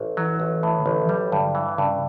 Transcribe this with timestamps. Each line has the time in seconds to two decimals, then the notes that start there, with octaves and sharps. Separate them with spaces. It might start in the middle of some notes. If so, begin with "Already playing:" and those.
Already playing: A1
0.17 E3 F#3
0.40 A1
0.47 E3
0.63 A2
0.79 D3
0.86 A1
1.05 E3
1.09 F#3 G3
1.32 G2 D3
1.55 E3
1.78 G2 C#3